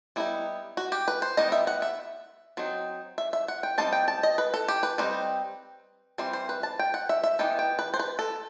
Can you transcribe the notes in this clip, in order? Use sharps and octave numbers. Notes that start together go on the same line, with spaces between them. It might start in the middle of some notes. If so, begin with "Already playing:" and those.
G3 B3 D#4 E4
F#4
G4
B4
C5
D#3 G3 B3 D#4 D#5
E5
F#5
E5
F#3 C4 D#4
E5
E5
F#5
G5
G3 C4 D#4 A5
G5
A5
D#5
B4
A4
G4
B4
G3 C4 D#4
E3 G3 C4 C5
C5
B4
A5
G5
F#5
E5
E5
E3 B3 D#4 G5
G5
B4
C5
B4
A4